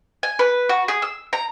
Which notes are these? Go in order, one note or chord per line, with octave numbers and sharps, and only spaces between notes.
G#5
B4
F#4
G#4
E6
A#5